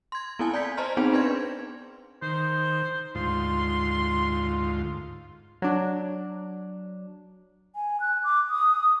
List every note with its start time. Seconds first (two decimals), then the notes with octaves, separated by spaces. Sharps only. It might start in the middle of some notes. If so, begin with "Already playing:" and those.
0.12 C6 G#6
0.39 B3 C4 E4 G#5 A5
0.53 D5 G#5 G6 G#6 B6
0.77 C5 D#5 A5 A#5 C6 F6
0.97 B3 C4 D#4 G#4 C5 G5
1.13 D4 B4 D5 C6 G#6
2.22 D#3 C5
3.15 D2 G#2 F4 C6
5.62 F#3 D4
7.75 G#5
8.01 F#6
8.24 D6
8.50 D#6